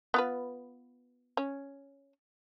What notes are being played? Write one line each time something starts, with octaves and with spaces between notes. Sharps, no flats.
B3 F4 B4
C#4